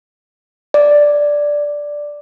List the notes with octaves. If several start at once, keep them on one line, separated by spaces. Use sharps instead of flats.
D5